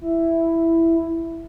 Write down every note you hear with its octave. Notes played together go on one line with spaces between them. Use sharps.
E4